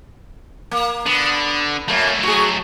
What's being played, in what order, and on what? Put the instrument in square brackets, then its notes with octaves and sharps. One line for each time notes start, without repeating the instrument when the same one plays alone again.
[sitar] A#3
[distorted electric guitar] D3 [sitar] B3
[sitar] F#2 A#3 [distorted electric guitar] F#3 A3
[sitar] F#4 G#4